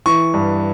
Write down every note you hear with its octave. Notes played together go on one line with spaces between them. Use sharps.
E3 C#6
G2